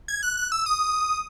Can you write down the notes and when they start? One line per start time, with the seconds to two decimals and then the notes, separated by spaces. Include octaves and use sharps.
0.08 G#6
0.23 F#6
0.37 F#6
0.52 E6
0.66 D#6